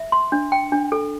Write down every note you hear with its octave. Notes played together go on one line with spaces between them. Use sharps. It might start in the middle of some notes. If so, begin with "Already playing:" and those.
Already playing: E5
C6
D4
G5
D4
A4